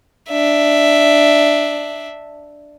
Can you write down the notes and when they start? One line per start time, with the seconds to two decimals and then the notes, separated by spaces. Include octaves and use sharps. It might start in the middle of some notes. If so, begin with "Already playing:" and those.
0.29 D4 E5